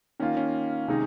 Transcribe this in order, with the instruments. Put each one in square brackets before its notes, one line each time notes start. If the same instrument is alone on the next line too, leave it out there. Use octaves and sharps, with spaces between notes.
[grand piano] D#3 A#3 F4 [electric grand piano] C#4
[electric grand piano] C#4
[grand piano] C3 D#3 G#3 D#4